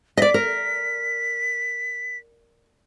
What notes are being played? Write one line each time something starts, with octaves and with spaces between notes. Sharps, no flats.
D5 D#5 B6
A#4